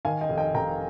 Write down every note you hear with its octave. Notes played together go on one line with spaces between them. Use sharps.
D#3 F5 G#5
D#5 G5
F1
D#5 G5
F1 G5 A#5